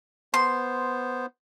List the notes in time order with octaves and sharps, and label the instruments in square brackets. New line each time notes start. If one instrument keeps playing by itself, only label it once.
[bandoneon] B3 C5 [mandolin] C6